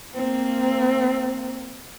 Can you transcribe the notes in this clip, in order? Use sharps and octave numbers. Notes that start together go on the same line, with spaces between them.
A#3 C4